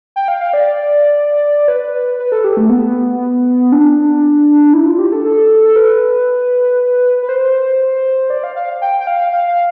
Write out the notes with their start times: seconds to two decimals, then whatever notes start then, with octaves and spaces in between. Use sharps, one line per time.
0.16 G5
0.28 F5
0.40 F5
0.53 D5
1.68 B4
2.19 B4
2.32 A4
2.44 G4
2.57 A3
2.69 B3
3.72 D4
4.74 E4
4.86 F4
4.99 G4
5.12 A4
5.25 A4
5.64 A4
5.76 B4
7.23 B4
7.29 C5
8.30 D5
8.44 F5
8.56 F5
8.81 G5
9.00 G5
9.07 F5
9.33 F5